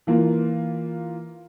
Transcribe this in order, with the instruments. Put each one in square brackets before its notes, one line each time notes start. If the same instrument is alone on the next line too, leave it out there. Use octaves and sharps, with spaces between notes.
[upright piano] E3 A#3 F4